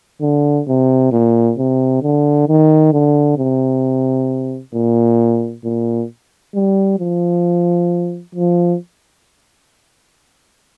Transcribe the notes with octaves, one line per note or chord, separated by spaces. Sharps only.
D3
C3
A#2
C3
D3
D#3
D3
C3
A#2
A#2
G3
F3
F3